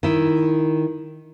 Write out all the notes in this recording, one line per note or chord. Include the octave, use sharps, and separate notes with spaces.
D#3 E4